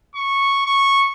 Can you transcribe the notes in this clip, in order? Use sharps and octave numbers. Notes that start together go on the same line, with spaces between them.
C#6
C#6